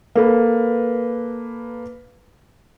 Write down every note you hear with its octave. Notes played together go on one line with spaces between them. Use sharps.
A#3 A4 B4